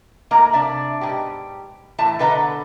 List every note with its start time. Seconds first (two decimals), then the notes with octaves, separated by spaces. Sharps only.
0.31 G#2 A3 A#3 A#4 A#5
0.53 C3 D4 D5 E5
1.01 G#2 B2 G4
1.98 E2 A2 E5 A5
2.19 B2 D3 B4 D#5 F#5 A#5